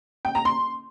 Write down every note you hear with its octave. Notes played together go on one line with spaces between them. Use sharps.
G5
A#5
C6